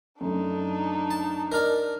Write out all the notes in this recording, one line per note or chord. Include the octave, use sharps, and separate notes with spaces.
F#2 A3 D4 D#4
A5
A#4 D5 D#5 F6